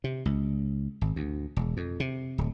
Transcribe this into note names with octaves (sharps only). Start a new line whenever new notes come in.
C3
C#2
G#1
D2
E1
F2
C3
D1